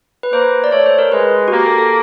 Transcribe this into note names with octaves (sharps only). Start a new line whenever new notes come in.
B4
A#3 C5
D5
A3 C#5
C5
A#4
G#3 B4
F#4
A#3 G4
A4
A4